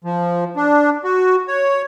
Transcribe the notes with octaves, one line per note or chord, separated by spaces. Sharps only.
F3
D4
F#4
C#5